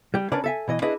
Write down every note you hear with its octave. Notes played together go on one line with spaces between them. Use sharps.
G3 G4
C#4 D4 A#4 B4 C#5 D5
A4 E5 G#5
B2 E3 D#5
D4 E4 G#4 B4 D#5